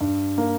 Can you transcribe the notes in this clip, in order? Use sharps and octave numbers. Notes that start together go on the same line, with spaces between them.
G2
A#3